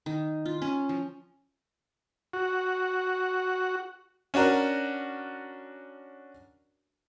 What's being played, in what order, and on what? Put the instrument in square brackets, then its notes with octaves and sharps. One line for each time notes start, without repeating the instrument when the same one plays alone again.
[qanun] D#3
F4
C#4
F3
[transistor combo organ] F#4
[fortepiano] C#4 D4 F#4 A#4